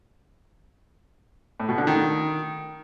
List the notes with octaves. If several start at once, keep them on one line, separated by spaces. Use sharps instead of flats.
A2
B2
D3
D#3